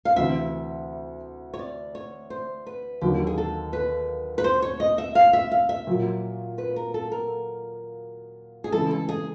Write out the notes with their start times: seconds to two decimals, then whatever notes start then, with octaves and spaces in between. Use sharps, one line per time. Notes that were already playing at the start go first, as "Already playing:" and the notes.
0.05 F5
0.16 D2 C3 E3 E5
1.54 C#5
1.59 D5
1.95 C#5
2.30 C5
2.66 B4
3.01 D#2 D3 F#3 A#3 G4
3.27 G#4
3.38 A4
3.73 B4
4.38 B4
4.44 C5
4.62 C#5
4.80 D#5
4.98 E5
5.15 F5
5.33 E5
5.51 F5
5.69 E5
5.87 A#2 F#3 A#3
6.58 B4
6.76 A#4
6.94 A4
7.12 A#4
8.64 G#4
8.72 C#3 E3 G#3 A4
8.91 A4
9.09 G#4